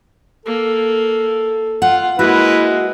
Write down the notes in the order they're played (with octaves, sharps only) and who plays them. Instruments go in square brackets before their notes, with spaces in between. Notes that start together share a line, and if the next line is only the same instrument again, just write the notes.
[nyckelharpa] A#3 [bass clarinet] A4
[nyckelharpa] F4 [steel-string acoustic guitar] F#5
[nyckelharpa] G#3 A#3 [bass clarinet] E4 [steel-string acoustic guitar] F#4 [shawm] B4